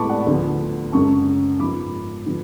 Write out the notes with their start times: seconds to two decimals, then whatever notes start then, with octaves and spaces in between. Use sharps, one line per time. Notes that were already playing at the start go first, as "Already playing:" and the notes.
Already playing: A2 G#3 B3 A5 B5 C#6 D6
0.09 D5 F#5
0.26 D2 D3 F3 B3
0.92 F#2 C#3 G#3 C#4 A5 C#6
1.59 G#2 F3 G#3 B3 B5 D6
2.26 D3 F3 B3